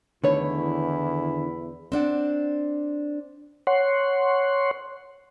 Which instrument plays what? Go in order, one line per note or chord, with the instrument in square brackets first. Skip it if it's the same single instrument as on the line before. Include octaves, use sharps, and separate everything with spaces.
[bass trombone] E2 [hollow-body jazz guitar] D3 D#3 B4 [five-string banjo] A3 C#5 [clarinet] E4
[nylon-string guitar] C4 D4 F#5
[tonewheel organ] C#5 F#5 C6